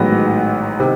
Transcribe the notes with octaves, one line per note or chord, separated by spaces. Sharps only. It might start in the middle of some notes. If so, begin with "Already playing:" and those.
Already playing: A1 G#2 D#3 F#3 B3 A#6
C3 D#3